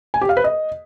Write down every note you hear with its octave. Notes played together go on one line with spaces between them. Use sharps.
G#5
G4
F5
B4
D#5